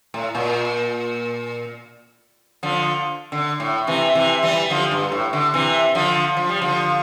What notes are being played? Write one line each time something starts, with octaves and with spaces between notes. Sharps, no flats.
A2
A#2
D3 F3
D3
A2
C3 E3
C3 E3
E3 G3
D3 F3
G2
A2
D3
C3 E3
D3 F3
F3
G3
D3 F3